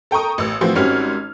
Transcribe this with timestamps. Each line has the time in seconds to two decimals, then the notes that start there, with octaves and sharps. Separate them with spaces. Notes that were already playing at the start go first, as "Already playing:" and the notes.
0.11 A4 G5 A#5 C#6 D#6
0.38 A1 E6
0.61 A2 E3 F3 C4 F#4
0.76 G#1 G3 C4 C#4 F#4 F6